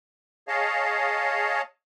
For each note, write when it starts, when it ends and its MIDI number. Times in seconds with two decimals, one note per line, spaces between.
0.48 1.62 68
0.48 1.62 73
0.48 1.62 75
0.48 1.62 77
0.48 1.62 81